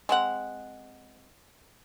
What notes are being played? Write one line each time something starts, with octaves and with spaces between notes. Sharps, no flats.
G#3 C4 F#5